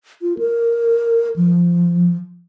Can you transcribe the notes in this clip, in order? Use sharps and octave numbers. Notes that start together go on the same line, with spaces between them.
F4
A#4
F3